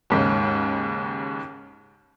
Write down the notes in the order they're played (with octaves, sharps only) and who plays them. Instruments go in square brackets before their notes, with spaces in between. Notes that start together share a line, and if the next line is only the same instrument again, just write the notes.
[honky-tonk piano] D#2 G#2 C#3